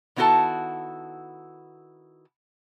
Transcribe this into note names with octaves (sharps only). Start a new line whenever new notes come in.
D#3 B3 E4 F#4 A4 A5